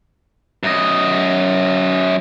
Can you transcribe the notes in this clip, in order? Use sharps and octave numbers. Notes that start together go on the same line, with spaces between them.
F#2 D#5